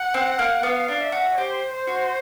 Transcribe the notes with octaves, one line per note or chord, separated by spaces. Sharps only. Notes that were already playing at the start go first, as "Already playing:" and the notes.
Already playing: F#5
C4
A#3
B3 F5
D4
E5
F#4
G4 C5
C5
F#4